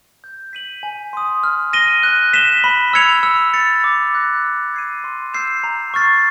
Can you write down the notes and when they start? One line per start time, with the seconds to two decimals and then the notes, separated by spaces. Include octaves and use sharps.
0.24 G6
0.53 B6 D#7 F#7
0.83 G#5
1.13 C6 D#6
1.43 F6
1.73 A#6 D#7 G7
2.03 F#6
2.33 B6 E7 G7
2.64 B5
2.93 E6 G#6 C#7 F7
3.23 E6
3.54 A6 C#7 F7
3.84 D6
4.13 F#6 A#6
4.44 E6
4.74 G#6 C7 D#7
5.04 C6
5.33 E6 G6 C7 E7
5.64 A#5
5.94 C#6 F6 A6 C7